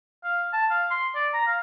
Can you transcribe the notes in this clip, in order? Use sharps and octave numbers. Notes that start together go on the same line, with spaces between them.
F5
A5
F5
C6
D5
A#5
F5